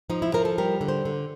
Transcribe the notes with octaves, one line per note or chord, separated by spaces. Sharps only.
F3 D#4
E4
F3 A#4
A4
G3 A#4
D3
C5
D3